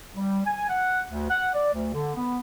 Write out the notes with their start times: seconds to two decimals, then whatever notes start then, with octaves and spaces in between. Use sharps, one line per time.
0.16 G3
0.45 G#5
0.69 F#5
1.09 D2
1.29 F#5
1.54 D5
1.74 D2
1.94 D3
2.16 B3